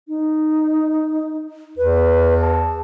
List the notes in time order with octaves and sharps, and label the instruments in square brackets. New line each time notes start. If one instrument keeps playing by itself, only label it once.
[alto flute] D#4
[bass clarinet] E2 [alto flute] B4
[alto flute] A5